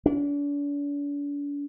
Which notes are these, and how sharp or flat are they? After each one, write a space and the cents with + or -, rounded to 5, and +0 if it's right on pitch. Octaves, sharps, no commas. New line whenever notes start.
D4 -40